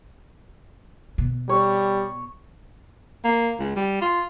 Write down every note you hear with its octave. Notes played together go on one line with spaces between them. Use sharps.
B2
G3 C#5
A#3
C#2
G3
F4